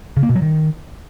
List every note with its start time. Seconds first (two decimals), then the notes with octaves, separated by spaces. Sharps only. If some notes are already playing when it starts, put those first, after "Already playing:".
0.17 C#3
0.23 A#3
0.29 B2
0.36 F#3
0.42 D#3